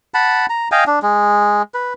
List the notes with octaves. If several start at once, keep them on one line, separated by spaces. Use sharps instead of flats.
F#5 A5 B5
A#5
D#5 F5 G5 G#5
D4
G#3
B4